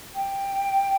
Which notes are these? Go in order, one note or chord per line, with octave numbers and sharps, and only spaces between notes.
G5